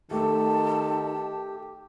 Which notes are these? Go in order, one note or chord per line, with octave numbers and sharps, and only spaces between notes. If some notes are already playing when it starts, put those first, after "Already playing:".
D#3 A3 G4 A5